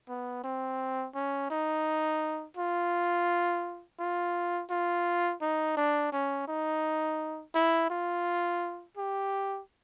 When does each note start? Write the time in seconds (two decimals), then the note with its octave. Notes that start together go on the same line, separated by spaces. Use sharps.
0.09 B3
0.44 C4
1.15 C#4
1.51 D#4
2.57 F4
3.99 F4
4.70 F4
5.41 D#4
5.77 D4
6.12 C#4
6.48 D#4
7.55 E4
7.90 F4
8.97 G4